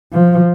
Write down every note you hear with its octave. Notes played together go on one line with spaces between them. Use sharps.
F3